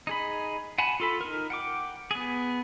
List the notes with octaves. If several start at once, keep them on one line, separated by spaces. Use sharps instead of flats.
D#4 G#4 B5
F#5 G#5 A5 B5
F4 A4 B5
D#4 A#4
F#5 G5 D6
B3 G#4